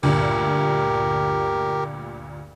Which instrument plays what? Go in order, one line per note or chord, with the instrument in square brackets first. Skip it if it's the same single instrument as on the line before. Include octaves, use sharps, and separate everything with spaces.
[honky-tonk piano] D2 G2 A#2 [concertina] G4 A#4